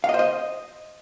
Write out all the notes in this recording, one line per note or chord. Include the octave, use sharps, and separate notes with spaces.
F5
D#5
C5
D#5